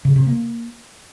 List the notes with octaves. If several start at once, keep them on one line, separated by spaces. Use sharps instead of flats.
C#3
C3
A#3